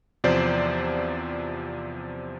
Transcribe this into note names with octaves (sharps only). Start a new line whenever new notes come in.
E2 C3 F3 C5 D5